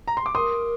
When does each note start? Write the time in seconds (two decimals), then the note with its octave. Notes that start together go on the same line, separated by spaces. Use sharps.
0.08 A#5
0.17 C6
0.26 D6
0.34 A#4 C6 D#6